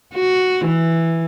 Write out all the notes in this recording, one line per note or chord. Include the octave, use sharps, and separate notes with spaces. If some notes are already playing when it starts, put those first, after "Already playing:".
F#4
E3